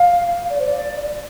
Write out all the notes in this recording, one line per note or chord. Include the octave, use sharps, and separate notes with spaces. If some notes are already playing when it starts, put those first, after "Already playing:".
Already playing: F5
D5
C5
D5